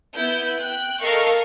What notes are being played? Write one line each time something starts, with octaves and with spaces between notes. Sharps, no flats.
B3 E4 G6
G5 F#6
A4 A#4 D#5 F5 C#6